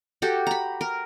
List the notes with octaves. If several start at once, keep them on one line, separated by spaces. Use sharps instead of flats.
F#4 G4 A4
A#5 B5
A#4